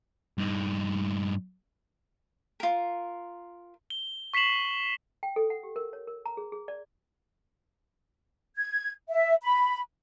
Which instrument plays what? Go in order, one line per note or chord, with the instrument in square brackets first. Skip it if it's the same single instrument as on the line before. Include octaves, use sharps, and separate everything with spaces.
[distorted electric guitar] G2 D#4
[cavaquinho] F4 A#4
[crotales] G7
C#6 B6 C7 E7 F#7
[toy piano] G5
A4
F#5
G4
A#4
C#5
A#4
A#5
G#4
G#4
D5
[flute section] G#6
E5
B5